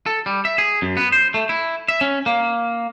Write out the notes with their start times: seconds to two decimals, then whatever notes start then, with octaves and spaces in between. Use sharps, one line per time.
0.06 A4
0.26 G3
0.45 E5
0.58 G#4
0.82 F#2
0.97 B3
1.12 C5
1.34 A3
1.49 E4
1.88 E5
2.01 C#4
2.26 A#3